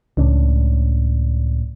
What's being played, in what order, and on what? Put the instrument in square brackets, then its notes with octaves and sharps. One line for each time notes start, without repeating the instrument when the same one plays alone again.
[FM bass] C#2 [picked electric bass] A2 C#4 D4